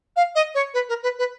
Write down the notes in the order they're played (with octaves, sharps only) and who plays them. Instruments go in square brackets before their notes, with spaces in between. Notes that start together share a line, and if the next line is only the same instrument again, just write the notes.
[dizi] F5
D#5
C#5
B4
A#4
B4
B4